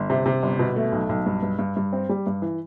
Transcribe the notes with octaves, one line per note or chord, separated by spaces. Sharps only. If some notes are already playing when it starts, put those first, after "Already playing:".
Already playing: G1
C3
C3
G1
B2
A3
B1
B1
G2
G2
G2
G2
C4
G3
G2
E3